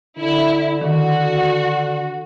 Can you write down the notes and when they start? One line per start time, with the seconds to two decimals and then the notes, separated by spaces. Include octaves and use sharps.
0.18 D3 E4
0.81 D#3 F#4